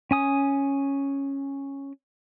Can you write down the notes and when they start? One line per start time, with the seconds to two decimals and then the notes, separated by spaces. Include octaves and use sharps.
0.11 C#4 G#5 D#6